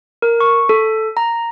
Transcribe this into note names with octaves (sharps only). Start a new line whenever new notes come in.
A#4
C#6
A4
A#5